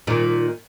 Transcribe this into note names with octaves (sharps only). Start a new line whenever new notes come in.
A#2 D#3